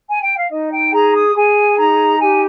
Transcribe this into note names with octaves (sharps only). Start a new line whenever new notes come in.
G#5
G5
F5
D#4 D#5
G5
G#4 A#5
D#6
G#4 G#5
D#4 A#5
G4 G#5